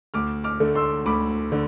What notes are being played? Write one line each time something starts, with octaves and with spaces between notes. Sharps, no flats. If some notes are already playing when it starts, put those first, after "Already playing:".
D2 D6 F6
D6 F6
D3 A3
C6 E6
D2 B5 D6
D3